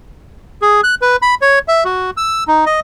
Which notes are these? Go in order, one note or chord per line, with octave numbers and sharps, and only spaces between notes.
G#4
F#6
B4
B5
C#5
E5
F#4
E6
D#4
D#5